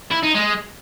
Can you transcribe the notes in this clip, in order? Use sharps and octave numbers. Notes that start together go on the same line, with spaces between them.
E4
D#4
G#3